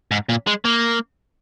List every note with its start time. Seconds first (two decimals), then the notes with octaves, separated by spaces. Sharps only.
0.11 G#2
0.29 A#2
0.47 G#3
0.65 A#3